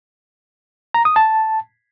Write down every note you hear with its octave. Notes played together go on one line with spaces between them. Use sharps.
A#5
D#6
A5